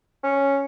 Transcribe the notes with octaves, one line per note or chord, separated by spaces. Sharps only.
C#4